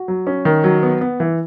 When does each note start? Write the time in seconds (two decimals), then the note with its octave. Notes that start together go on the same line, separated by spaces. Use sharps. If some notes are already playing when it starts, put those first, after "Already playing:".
Already playing: F#4
0.08 F#3
0.27 C#4
0.45 D#3
0.64 F#3
0.83 B3
1.01 B3
1.20 E3